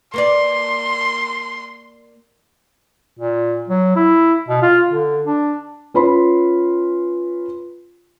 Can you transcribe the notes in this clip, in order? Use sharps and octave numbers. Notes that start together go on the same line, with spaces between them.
A#3 B4 D5 C6
A#2
F#3
E4
B2
F4
D3
D4
C#4 F4 B4 B5 C6